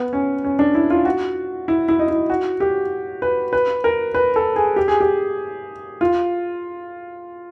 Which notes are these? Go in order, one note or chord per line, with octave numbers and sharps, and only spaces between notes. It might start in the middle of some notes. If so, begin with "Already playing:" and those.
Already playing: B3
C#4
C#4
D4
E4
F4
F#4
E4
E4
D#4
E4
F#4
G4
B4
B4
A#4
B4
A4
G#4
G4
G#4
G4
F4